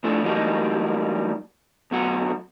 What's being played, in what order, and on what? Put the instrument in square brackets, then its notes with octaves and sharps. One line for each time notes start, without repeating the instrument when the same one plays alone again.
[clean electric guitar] A2 F3 A3 D4
E3 F#3 G3 A3 A#3 D#4
D2 B2 F#3 F#5